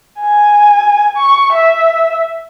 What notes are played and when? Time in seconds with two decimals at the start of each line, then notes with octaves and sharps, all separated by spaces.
0.20 G#5
1.17 C#6
1.54 E5